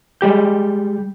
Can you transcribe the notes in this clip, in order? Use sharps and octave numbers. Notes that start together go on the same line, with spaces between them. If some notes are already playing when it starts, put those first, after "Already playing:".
G3 G#3 G4 G6